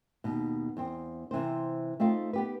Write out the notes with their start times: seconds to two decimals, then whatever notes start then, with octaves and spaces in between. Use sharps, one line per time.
0.24 D#2 B2
0.77 E2 C4
1.31 C3 E3 C4 C5
2.00 A3 C4 D#4 F4
2.33 B3 G4 B4